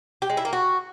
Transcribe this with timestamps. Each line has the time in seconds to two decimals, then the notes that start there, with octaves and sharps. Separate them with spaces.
0.22 G4
0.30 G#3
0.37 E4
0.45 A#3
0.53 F#4